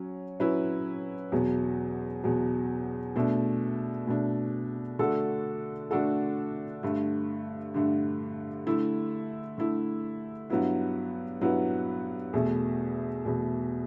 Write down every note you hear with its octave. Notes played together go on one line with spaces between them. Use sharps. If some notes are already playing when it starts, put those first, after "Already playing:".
Already playing: F#3 C#4
F#3 C#4 E4 B4
E2 B2 F#3
E2 B2 F#3
B2 A3 D4
B2 A3 D4
D3 A3 D4 F#4 A4
D3 A3 D4 F#4 A4
G2 D3 A3
G2 D3 A3
D3 A3 E4
D3 A3 E4
G2 F#3 B3 E4 B4
G2 F#3 B3 E4 B4
E2 B2 A3
E2 B2 A3